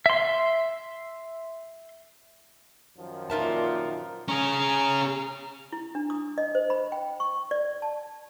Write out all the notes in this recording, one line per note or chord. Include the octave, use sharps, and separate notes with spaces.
E5 C6
F#2 D#3 F3
A#2 D#4 F4 A#4 B4 E5 A5
C#4 G#4 A#5
E4
D4
D#6
D#5
C5
B5
G5
C#6
D5
A5